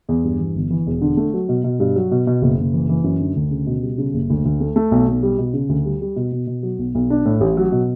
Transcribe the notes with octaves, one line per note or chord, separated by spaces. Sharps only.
E2
G2
E3
G1
E3
E1
D3
A3
F#3
B2
B2
G2
F#3
B2
B2
F#1
F#1
E3
E3
F#2
D3
D2
C#3
B2
G3
C#3
F#1
D2
D2
A3
A3
B1
B1
G3
B2
C#3
D2
G3
G3
B2
B2
B2
F#3
B1
B1
D4
A2
A1
F#3
B2